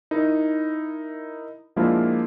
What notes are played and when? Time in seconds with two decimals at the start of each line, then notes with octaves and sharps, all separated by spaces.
0.11 D#4 E4 A#4
1.76 F3 G#3 A#3 D4 E4 F4